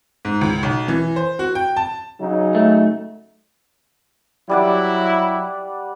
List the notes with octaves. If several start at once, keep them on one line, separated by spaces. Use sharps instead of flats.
G#2
C#2
B1
E3
C5
F#4
G5
A5
C#3 F#3 D#4
A3
F#3 G3 E4 D5 F#5